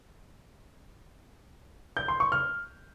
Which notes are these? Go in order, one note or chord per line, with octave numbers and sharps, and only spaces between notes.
G6
C6
C#6
F6